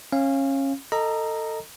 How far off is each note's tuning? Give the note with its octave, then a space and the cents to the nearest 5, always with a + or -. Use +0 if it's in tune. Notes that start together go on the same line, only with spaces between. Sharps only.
C#4 -25 F5 -10
A4 +25 D#5 +0 A#5 +0